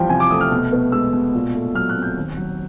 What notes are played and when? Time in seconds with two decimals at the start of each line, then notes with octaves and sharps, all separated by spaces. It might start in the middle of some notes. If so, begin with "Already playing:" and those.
Already playing: E2 F3 G3 G5
0.10 C3 G#5
0.20 D6
0.30 A3 D#6
0.41 F6
0.52 B2
0.73 B3
0.92 G#3 E6
1.13 B2
1.35 A#2
1.55 A3
1.75 F#3 F6
1.89 F#6
1.96 C4
2.02 G6
2.17 D#2
2.37 F#3